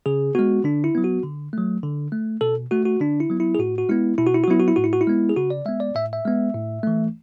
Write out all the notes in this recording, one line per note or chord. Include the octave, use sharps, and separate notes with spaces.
C#3 G#4
G#3 B3 F#4
D3 D4
E4
F#3 B3
F#4
D3
F#3 A3
D3
A3
B2 A4
A3 F#4
F#4
D3 D4
E4
F#3 B3
E4
G#4
A2 F#4
F#4
G#3 B3 E4
B2 E4
F#4
E4
F#4
F#3 B3 E4
F#4
E4
A2 F#4
E4
F#4
E4
G#3 B3
G#4
C#3 F#4
D5
G#3 B3 E5
D5
A2 E5
E5
G#3 B3
A2
E3 A3